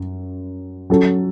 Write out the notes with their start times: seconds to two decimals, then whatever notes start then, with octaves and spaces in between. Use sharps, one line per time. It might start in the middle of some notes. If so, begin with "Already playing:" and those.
Already playing: F#2
0.90 F#3 C#4 A4